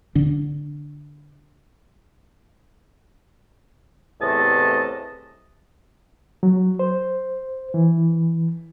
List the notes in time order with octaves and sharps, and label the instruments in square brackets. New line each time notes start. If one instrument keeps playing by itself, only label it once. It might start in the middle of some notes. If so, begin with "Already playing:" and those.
[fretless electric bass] D3 D4
[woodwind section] E2 A2 C3 A3 D#5 A5
[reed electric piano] F#3
C5
E3